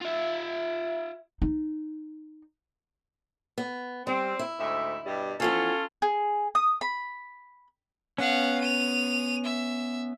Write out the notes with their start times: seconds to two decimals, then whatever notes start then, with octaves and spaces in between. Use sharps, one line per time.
0.02 F4 E5
1.42 D#4
3.58 B3
4.07 G3 C4
4.39 E4
4.60 D2 G#2 E5
5.06 G2 B2 G3
5.40 E3 F3 B3 C#4 F4 A4
6.02 G#4
6.55 D#6
6.81 B5
8.18 B3 C#4 F5 F#5
8.61 D#7 F7
9.45 E5